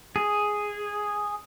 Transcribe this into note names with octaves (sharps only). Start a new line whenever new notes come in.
G#4